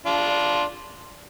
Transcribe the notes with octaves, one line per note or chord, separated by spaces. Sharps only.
D4 F4